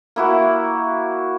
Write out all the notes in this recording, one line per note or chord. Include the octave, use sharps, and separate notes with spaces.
A#3 E4 F#4